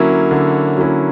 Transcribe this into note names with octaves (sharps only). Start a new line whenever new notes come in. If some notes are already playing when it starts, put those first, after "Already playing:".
Already playing: D3 F#3 A#3 C#4 E4
D3
F#3 A#3 C#4 E4